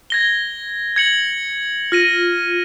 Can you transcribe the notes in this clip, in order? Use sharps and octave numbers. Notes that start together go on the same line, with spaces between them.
G#6 A#6 G7
G#6 C#7 F#7
F4 F6 A#6 D#7